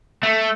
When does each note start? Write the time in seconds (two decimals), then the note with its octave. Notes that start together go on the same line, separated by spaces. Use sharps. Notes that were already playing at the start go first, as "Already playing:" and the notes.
0.23 A3